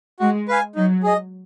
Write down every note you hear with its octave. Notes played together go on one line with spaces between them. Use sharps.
G#3 F#4
B4 F5 G#5
F#3 D#4
G#4 D#5